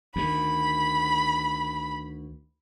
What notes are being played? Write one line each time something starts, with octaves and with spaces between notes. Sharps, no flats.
D2 D#3 B5